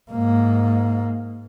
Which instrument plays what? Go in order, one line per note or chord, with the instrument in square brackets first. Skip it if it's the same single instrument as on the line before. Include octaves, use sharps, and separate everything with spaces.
[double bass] G#2 A#3